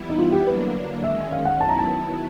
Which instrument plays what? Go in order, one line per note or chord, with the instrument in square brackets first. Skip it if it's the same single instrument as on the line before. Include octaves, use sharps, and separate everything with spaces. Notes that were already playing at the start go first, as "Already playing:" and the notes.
Already playing: [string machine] E3 G3 B3 E4
[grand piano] D#4
F4
G4
[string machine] D3 F#3 A#3 D4 [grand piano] B4
[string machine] D#3 G#3 C#4 [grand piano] E5
[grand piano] F5
F#5
[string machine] D#3 F#3 B3 E4 [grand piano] A5
[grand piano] A#5
A5